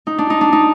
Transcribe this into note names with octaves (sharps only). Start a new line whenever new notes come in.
D#4
D4
D#4
D4
D#4